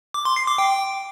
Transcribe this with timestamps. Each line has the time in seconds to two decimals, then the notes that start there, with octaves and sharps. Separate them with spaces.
0.14 D6
0.25 C6
0.36 C7
0.47 D6
0.58 G5